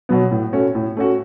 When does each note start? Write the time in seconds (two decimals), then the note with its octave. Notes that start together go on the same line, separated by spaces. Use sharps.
0.09 B2 F#3 B3
0.31 A2
0.52 A3 C#4 F#4
0.75 A2
0.97 A3 C#4 F#4